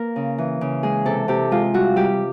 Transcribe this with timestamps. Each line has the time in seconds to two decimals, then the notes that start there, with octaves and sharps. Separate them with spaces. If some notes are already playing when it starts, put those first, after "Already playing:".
Already playing: A#3 A#4 F5
0.16 C#3
0.38 E3
0.61 C#3
0.83 G#3 G#4
1.05 C3 A4
1.28 C3 G4
1.51 G#3 F4
1.74 G3 F#4
1.96 G3 G4